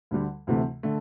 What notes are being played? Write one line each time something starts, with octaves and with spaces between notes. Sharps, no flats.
D2 D3 G3
D2 C3 E3 A3
D3 A3